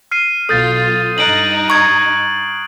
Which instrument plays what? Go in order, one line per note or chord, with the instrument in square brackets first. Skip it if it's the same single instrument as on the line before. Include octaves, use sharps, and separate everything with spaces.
[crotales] F6 C7 D#7
[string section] B1 F4 [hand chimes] A4 [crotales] D#6 G6 A6
[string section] G2 D#4 [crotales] F#6 D7 F#7
[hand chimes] A#5 C#6 G#6